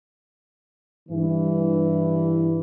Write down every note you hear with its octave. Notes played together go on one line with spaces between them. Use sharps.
G2 E3